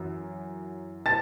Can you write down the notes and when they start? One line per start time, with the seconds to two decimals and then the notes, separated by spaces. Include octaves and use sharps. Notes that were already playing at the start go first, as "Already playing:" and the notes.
Already playing: F#2 E3
1.06 A5 A6